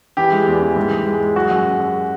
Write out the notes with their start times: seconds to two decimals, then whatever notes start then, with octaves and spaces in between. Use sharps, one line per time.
0.17 E3 G4
0.32 G#3
0.47 E2
0.62 E3
0.76 G#2
0.91 G#2
1.06 G#3
1.20 G#3
1.36 F#3 F#4
1.51 F#2
1.66 F#2
1.80 F#2